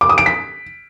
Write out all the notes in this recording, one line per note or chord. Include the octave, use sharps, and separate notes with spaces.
D6
D#6
D7
B6